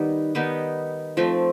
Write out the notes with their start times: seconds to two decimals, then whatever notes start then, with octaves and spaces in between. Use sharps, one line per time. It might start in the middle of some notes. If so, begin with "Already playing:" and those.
Already playing: D#3 G3 B3 D#4
0.35 D#3 G3 B3 D#4
1.17 F3 A3 C4